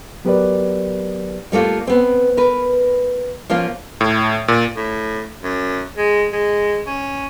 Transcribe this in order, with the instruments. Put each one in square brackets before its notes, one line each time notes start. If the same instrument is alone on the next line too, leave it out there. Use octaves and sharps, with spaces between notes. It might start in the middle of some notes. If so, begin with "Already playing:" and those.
[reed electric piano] F#3 B3 G4 A#4 B4 D5
[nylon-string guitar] G3 A3 A#3 F4
B3 C4
A#4 B4
F3 A#3 C#4 F4
[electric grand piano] A2
A#2
[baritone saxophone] A2
F#2
G#3
G#3
C#4